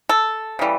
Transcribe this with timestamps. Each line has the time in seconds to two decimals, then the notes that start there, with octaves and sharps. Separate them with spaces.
0.09 A4
0.59 C#3 E3 G3